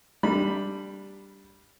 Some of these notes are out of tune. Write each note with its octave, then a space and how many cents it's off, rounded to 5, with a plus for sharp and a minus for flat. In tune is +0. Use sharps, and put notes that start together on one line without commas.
G3 +0 D4 +0 B5 +0